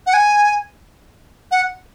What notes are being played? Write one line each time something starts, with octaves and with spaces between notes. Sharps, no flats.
F#5
G#5
F#5